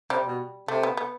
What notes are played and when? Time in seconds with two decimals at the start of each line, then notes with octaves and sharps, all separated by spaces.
0.10 C3 G3
0.25 B2
0.68 C3 A3
0.83 B3
0.97 B3